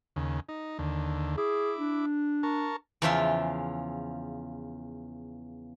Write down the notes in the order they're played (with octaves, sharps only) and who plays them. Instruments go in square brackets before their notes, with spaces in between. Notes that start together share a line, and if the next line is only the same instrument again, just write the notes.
[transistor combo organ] D#2 C#3
D#4
D#2 D3
[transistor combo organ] E4 D6 [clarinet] G#4
[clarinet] D4
[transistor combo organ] A#4 A5 C#6
[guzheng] E2 C#3 F3 F4 E5 C6